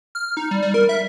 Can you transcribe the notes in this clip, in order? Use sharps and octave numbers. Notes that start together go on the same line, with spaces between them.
F6
D#4
G3
G3
A#4
E5